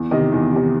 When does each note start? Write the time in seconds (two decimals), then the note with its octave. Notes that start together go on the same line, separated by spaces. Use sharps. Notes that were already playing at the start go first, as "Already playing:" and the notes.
Already playing: E2
0.11 C3 D#3 D#5
0.33 E2
0.53 C3 D#3